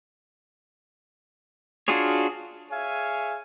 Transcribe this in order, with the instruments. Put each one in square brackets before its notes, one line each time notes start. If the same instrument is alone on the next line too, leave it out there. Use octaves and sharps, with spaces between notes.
[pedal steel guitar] D4 F4 F#4 G#4 C#5
[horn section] G#4 C#5 E5 F5 G#5